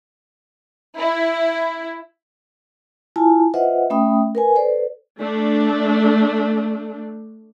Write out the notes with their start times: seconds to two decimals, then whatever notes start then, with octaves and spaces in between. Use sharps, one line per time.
0.96 E4
3.16 E4 F4 G#5 A5
3.54 F4 B4 C5 D#5 E5 F#5
3.90 A3 C#4 E5 G5 B5 D#6
4.35 A#4 B4 G#5
4.55 A4 B4 C5 D5
5.19 A3 D4